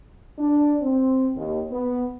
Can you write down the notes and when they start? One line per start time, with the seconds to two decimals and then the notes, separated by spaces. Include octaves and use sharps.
0.38 D4
0.81 C4
1.35 D#2
1.71 B3